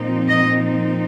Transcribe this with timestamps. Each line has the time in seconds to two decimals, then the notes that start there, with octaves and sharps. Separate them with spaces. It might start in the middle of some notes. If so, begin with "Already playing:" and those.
Already playing: A#2 F3 C4 D#4
0.29 D#5